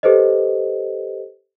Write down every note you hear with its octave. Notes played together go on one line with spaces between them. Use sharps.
G4 A4 B4 C5 D#5